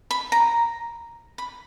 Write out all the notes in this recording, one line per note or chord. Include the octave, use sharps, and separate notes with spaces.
B5
A#5
B5